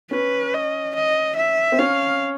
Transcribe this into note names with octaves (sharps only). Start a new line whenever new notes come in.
C#4 B4
D#5
D#5
E5
C4
C#4 F5